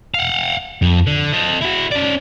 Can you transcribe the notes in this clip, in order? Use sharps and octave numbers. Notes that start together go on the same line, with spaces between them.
F5 F#5
F2
D3
A4 D#5
E4 F#4
C#4 D5